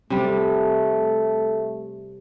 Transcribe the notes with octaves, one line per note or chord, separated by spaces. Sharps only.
C3 G3 A3